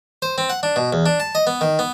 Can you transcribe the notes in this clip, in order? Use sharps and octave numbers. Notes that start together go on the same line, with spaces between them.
C5
C4
F#5
D4
B2
E2
D4
A5
D#5
B3
D#3
B3